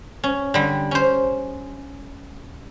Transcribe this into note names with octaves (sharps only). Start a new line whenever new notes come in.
C#4
D3 G3
C#4 C5